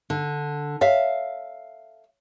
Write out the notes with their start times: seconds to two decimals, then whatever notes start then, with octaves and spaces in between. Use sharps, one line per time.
0.10 D3
0.81 C#5 E5 F5